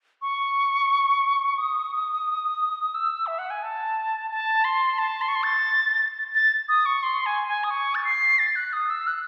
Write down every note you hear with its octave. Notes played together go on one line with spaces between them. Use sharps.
C#6
D#6
E6
E5
F#5
G#5
A5
A5
C6
A5
C6
C#6
C6
A6
A6
D#6
C#6
C6
G#5
G#5
D#6
C#6
A6
C7
A6
F#6
D#6
E6
F#6